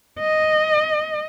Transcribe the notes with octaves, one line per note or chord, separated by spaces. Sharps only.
D#5